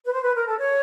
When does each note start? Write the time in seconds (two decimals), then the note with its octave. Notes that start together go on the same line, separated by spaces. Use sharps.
0.05 B4
0.12 C5
0.24 B4
0.36 A#4
0.47 A4
0.59 C#5